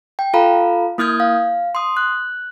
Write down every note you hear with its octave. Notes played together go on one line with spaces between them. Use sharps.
G5
F4 A4 F5 A#5 B5
A#3 E4 D#6 F6 G6 G#6
F5
C6 D#6
F#6